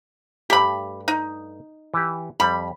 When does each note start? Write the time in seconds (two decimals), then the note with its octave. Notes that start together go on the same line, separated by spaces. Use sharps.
0.50 G2 A3 G4 B5
1.08 D#4
1.94 E3 G4
2.40 F2 G3 B5